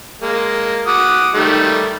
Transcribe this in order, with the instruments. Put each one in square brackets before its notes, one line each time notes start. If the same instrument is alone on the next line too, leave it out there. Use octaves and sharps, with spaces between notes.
[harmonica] G#3 A#3
F#4 D6 D#6
D#3 G3 A3